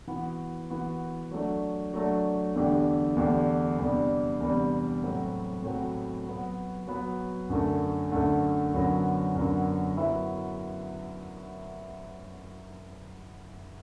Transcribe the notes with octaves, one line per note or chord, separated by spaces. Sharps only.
E3 B3 F#4
E3 B3 F#4
F#3 A3 D4
F#3 A3 D4
E2 D3 A3 D4 G4
E2 D3 A3 D4 G4
E2 C3 G3 D4
E2 C3 G3 D4
A2 F#3 C4 F#4
A2 F#3 C4 F#4
F#3 B3 F#4
F#3 B3 F#4
F#2 D3 A3
F#2 D3 A3
F#2 D3 F#3 B3
F#2 D3 F#3 B3
F#3 B3 E4 B4 E5